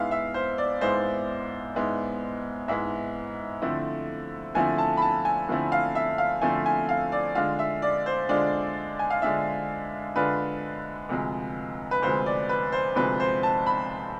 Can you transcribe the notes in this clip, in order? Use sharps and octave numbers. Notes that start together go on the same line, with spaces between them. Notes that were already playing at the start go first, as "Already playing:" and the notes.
Already playing: G#2 G#3 B3 E4 F5
E5
C5
D5
G#2 G#3 B3 E4 C5
G#2 G#3 B3 E4
G#2 G#3 B3 E4 E5
D3 F3 A3 C4 E4
D3 F3 A3 C4 E4 G#5
A5
B5
A5
G#5
D3 F3 A3 C4 E4
F5
E5
F5
D3 F3 A3 C4 E4 G#5
G#5
F5
D5
D3 G#3 D4 F4 F5
E5
D5
C5
D3 G#3 D4 F4 D5
G#5
F5
D3 G#3 D4 F4 E5
D3 G#3 D4 F4 B4
D2 C3 F3 G#3
B4
D2 C3 F3 G#3 C5
D5
B4
C5
D2 C3 F3 G#3 B4
C5
A5
B5